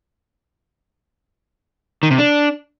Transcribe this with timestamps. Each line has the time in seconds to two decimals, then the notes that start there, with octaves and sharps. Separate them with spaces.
2.03 D#3
2.11 C3
2.18 D4